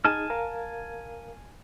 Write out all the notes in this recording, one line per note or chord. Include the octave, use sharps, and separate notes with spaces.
D#4 G#4 G#5 A5 F6
A#4 F5